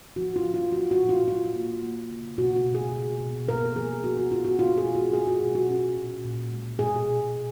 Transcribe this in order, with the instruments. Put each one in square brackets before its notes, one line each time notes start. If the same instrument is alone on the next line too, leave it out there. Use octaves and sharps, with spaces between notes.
[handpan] F3 F#4
F4
F3
F4
F3 F#4
F#4
A#2
F4
F#3 F4
A#3
A#3
C#3
B2 F#4
F#4
B2
G#4
B2
B2
B3 A#4
F3 G#4
B3 F#4
F#4
B3 F4
F#4
B2 F4
G#4
B2
F#4
C#4 G#4
F#4
B2
F#4
C#4
A#2
A#2
G#3
B2 G#4
B2
B2